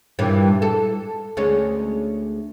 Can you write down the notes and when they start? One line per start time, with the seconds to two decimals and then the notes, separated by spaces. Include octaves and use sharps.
0.19 G2 A#2 E3
0.62 A4
1.37 D2 G#3 C#4